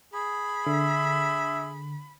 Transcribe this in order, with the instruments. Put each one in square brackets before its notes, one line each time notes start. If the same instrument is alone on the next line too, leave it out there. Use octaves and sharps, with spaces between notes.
[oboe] G#4 [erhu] B5
[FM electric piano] D3 [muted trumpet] E5